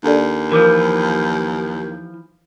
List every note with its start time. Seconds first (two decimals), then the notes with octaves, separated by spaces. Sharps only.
0.04 D#2 D4 A4 D5
0.52 E3 F3 A#4 D6